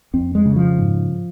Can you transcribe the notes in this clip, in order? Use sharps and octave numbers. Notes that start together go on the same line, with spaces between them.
F2 C4
G#3
C#3
F3
G#2